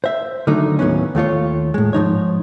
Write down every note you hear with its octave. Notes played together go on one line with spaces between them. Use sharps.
C5 E5
D3 D#3 F#3 A3 D#4
D#2 A2 F#3 B3 C#4
D#2 A3 F4 C#5
A2 G#3
G#2 F3 D#4 C#5